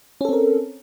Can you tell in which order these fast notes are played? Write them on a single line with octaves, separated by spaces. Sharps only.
C#4 A4 C4 A#4